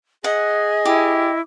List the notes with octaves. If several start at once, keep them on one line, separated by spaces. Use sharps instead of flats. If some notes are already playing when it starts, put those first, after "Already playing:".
G#4 D#5 F#5
E4 G4